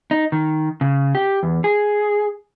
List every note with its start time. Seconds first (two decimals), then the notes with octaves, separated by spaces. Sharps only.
0.11 D#4
0.32 D#3
0.81 C#3
1.15 G4
1.43 E2
1.64 G#4